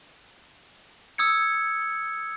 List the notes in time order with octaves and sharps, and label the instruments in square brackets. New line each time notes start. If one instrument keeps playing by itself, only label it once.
[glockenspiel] D#6 E6 G#6 C#7